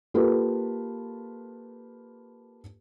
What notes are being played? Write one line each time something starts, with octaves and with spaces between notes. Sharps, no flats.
A#3 F4 G4 A4 B4